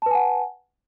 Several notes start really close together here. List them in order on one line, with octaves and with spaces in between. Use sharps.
A5 B4 G#5 F#5